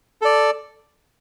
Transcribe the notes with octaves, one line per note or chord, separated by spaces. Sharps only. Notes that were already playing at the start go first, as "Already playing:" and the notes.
A4 D5